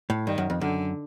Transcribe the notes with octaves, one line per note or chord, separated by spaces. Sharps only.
A2
G2 D#3
F#2
F2
F#2 D3